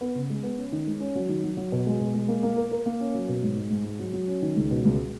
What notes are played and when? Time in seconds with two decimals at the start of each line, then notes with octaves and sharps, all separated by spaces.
0.01 B3
0.15 C#3
0.30 G#3
0.43 B3
0.58 C#4
0.72 D#3
0.87 G#3
1.00 C#4
1.15 F#3
1.29 D#3
1.44 F#3
1.57 F#3
1.72 B2
1.86 G#3
2.00 B2
2.14 G#3
2.28 A#3
2.43 A#3
2.56 A#4
2.71 A#4
2.86 A#3
3.00 C#4
3.14 F#3
3.28 B2
3.43 G#2
3.56 G#3
3.70 G#2
3.84 G#3
3.99 F#3
4.13 F#3
4.28 C#4
4.42 D#3
4.56 C#2
4.71 B2
4.85 C#2